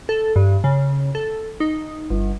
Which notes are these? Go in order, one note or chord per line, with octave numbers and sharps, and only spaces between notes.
A4
G2
C#3
A4
D#4
G1